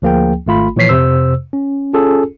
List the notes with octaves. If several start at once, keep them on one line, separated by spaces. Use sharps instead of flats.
D2 F3 A#3 G#4 G5
G#1 A3 F4 B5
A#2 E3 F3 C#5 B6 C7
F2 C3 C5 E6
C#4
C#4 F4 G#4 A4